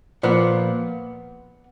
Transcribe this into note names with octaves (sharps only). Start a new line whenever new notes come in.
A#2 F3 B3